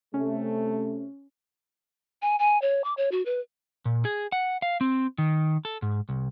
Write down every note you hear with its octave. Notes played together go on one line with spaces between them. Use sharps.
C3 A3 C#4
G#5
G#5
C#5
D6
C#5
F#4
B4
A#2
G#4
F#5
F5
C4
D#3
A4
G#2
C2